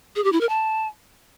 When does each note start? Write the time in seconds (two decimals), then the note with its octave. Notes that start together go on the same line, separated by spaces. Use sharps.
0.16 G#4
0.24 G4
0.32 E4
0.41 A#4
0.49 A5